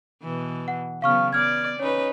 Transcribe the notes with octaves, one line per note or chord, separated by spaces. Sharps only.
B2 E3
F#5
C#3 F#3 B3 F5 C#6 F6
B3 D5 F6 G#6
C#4 D#4 B4 C#5